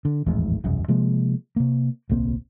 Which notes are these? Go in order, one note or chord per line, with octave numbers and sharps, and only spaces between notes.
D3
D#1 A1 F2 G#2
E1 C2 F#2
C3 F3 G#3 A#3
C3 A#3
D1 B1 A#3 C4